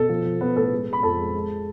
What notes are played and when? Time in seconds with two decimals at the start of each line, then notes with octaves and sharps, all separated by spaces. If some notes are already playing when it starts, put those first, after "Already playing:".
Already playing: B2 A4
0.09 F3
0.25 F3
0.41 F3 B3 B4
0.56 A2 A4
0.72 G#3
0.87 G#3
0.93 B5
1.03 F2 A4 A5
1.19 G#3
1.34 G#3